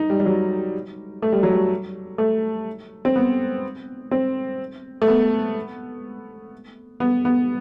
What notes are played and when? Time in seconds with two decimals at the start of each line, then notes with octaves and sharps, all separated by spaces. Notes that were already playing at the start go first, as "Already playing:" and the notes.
Already playing: D#4
0.10 G3
0.20 G3
0.25 F#3
1.22 A3
1.32 G3
1.43 F#3
1.53 G3
2.18 A3
3.05 C4
3.16 B3
4.11 C4
5.02 A3
5.08 B3
7.00 B3
7.25 B3